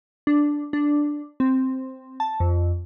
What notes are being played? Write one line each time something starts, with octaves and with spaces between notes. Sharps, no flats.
D4
D4
C4
A5
F2